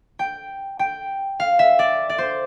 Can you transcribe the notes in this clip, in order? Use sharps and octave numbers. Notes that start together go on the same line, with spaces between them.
G5
G5
F5
E5
D5
D5
C5